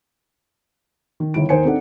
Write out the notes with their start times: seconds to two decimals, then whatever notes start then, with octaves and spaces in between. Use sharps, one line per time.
1.20 D#3
1.34 G1 D#3 E4 D7
1.49 D#2 D#4 A#4 C5 G#5 C#7
1.65 C4 D4 D#4 A4 F#5